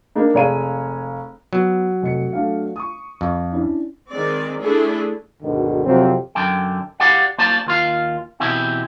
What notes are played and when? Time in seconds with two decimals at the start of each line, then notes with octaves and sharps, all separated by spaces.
0.15 A#3 D4 D#4
0.34 F1 G#3 C#5 F5 D#7
1.53 F#3 B3
2.02 F1 D#5 C#7
2.33 A3 D4 F5
2.76 C#6 D#6
3.21 F2
3.51 C#4 D4 E4
4.09 D#3 G#3 C4 D5
4.60 A3 D4 E4 G#4 A4
5.43 D2 G#2 B2 D3 D#3
5.85 F2 C3 F3 F#3 C4
6.35 F#2 D3 G5
7.00 G4 D5 F5 F#5
7.38 A#3 C5 D5 A5
7.67 D#2 F4 F5
8.40 B2 E3 C4 E4 G4